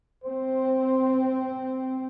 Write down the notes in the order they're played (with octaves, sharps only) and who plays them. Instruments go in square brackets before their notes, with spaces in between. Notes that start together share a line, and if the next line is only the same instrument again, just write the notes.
[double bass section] C4 [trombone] C5